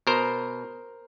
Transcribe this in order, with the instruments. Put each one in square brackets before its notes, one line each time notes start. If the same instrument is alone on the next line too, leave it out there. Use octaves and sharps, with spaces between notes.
[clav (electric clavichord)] B2 A#4 C5